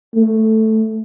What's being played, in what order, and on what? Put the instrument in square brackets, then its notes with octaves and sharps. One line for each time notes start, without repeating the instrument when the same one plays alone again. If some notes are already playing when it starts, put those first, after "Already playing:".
[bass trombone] A3